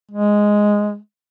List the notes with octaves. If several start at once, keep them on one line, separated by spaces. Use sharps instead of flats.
G#3